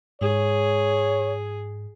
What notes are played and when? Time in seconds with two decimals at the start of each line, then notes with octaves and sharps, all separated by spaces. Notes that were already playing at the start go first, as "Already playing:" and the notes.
0.21 G#2 G#4 C#5